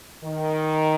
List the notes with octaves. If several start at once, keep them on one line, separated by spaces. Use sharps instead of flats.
D#3